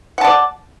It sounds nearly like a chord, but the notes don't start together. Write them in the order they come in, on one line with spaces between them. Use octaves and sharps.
F#5 A5 D5